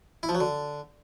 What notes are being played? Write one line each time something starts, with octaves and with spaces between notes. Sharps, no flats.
E4
F3
F#3
D3